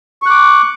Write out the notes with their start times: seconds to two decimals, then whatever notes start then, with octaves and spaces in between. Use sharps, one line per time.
0.22 C#6
0.26 F#6
0.30 D6